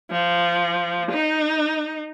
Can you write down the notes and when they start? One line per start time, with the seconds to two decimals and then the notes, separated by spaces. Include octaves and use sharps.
0.10 F3
1.11 D#4